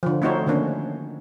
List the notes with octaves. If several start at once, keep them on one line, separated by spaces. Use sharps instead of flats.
D3 F3
A3 C4 D#4 F#4 C5 C#5
D3 D#3 A3 A#3 C#4 D4